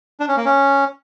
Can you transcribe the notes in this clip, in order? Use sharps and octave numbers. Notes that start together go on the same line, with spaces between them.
D4
C#4
A#3
C#4